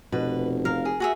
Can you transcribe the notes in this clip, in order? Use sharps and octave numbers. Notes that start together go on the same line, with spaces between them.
F1 B2 B4
A#4 F5
G#4
F#4 G#4 E5